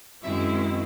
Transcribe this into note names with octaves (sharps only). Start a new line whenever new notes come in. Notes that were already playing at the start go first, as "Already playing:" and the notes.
F#2 D#3 G#3 C4 E4 E5